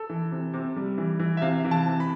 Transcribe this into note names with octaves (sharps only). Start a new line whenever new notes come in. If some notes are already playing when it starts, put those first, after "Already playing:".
Already playing: A4
E3
C3
C3
G3
E3
E3
E5
C3 F5
E3
A5
C3
B5